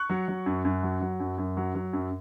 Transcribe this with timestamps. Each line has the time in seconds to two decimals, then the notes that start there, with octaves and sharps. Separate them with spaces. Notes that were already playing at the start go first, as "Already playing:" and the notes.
Already playing: C#6 F#6
0.10 F#3
0.28 F#3
0.46 F#2
0.65 F#2
0.83 F#3
1.01 F#3
1.20 F#2
1.38 F#2
1.57 F#3
1.75 F#3
1.93 F#2